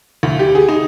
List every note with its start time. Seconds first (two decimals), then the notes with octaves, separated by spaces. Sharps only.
0.23 D2
0.39 G4
0.55 G#4
0.69 D#4